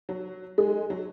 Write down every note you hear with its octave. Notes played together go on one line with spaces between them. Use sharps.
F#3
G#3
F#3